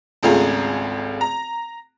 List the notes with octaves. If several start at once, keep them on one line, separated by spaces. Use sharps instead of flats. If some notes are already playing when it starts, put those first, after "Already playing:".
G#1 C#2 A3 F4 G#4 A#5
A#5